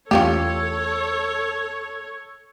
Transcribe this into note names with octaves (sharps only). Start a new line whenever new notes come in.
E2 A3 C#4 F4 G4 A4 C#5